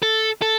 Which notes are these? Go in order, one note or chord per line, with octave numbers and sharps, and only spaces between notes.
A4
A4